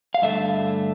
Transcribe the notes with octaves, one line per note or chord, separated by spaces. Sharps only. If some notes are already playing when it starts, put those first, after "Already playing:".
F5
G2 D3 A3 E5